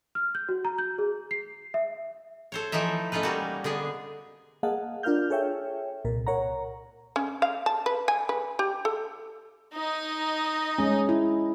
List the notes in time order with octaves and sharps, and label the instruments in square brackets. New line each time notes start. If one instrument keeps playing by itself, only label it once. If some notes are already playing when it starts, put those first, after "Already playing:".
[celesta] F6
G6
F#4
A#5
G6
G#4
C7
E5
[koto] A4 C5 C#5
E3 F3 A3 D#4 E5
A3 C#4 D#4 F4 B4
G3 A#3 F#4
D3 B3 D4 G#4
[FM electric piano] A#3 G#4 D#5 F5 F#5 A5
D4 F4 A#4 F5 F6 G6
G#4 A4 C#5 E5 G5
C2 A#2 A#4
A#4 C#5 F#5 A#5
[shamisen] C#4
F5
A5
B4
G#5
B4
G4
A4
[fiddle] D#4 D#5
[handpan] G#3 C#4
E4